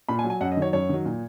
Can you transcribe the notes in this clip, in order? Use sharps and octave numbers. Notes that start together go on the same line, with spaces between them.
A#2 B5
G#5
F#3
G#5
F#2 F#5
D#5
D#3 F#3 C#5
F#2 C#5
D#3 F#3
A#2